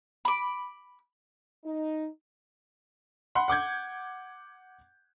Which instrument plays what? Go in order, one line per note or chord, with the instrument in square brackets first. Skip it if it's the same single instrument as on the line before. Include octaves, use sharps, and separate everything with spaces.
[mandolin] B5 D6
[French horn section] D#4
[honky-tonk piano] F#5 B5 C6
F#5 D6 G6 G#6